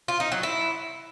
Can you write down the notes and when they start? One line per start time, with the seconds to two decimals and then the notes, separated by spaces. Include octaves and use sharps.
0.08 F4
0.20 D#4
0.32 F#3
0.43 E4